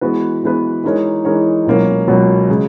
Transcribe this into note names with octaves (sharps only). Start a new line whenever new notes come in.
E3 G#3 B3 F#4 B4
E3 G#3 B3 F#4 B4
E3 G#3 D#4 A#4 C#5
E3 G#3 D#4 A#4 C#5
C#2 B2 F#3 A#3 C#4
C#2 B2 F#3 A#3 C#4
C#3 G#3